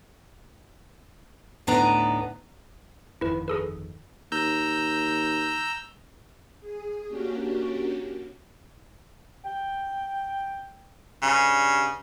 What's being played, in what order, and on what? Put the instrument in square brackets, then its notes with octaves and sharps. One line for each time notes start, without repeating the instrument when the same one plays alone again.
[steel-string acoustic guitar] D2 A2 B3 D4 D#4 A#5
[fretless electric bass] G1 F2 D#3 [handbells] E4 B4
[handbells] G#4 A4 B4
[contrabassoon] D#2 [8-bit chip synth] A#5 E6 G6
[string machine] G#4
A#3 C#4 D4 F#4 G4
[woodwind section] G5
[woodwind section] G2 [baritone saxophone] C#3